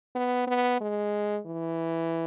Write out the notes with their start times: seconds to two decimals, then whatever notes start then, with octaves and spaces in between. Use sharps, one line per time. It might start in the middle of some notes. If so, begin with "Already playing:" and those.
0.15 B3
0.47 B3
0.81 G#3
1.47 E3